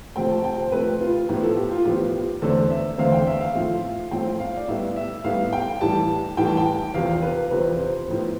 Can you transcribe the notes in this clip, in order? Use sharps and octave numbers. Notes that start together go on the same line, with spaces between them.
C3 F3 A3 C4 G5
A5
G5
C5
C3 F3 A3 C4 B4
F4
A2 F3 B3 G4
A4
G4
F4
A2 F3 B3 G4
E2 D3 A3 C4 A4
E5
E2 D3 A3 C4 F5
G5
E5
F5
A2 F3 A3 C4
A2 F3 A3 C4 G5
F5
D5
A2 G3 B3 E5
E5
A2 G3 B3 F5
G5
A2 E3 G3 A5
A2 E3 G3 G5
A5
G5
E2 C3 F3 F5
B4
E2 C3 F3 B4
C5
A2 F3 B3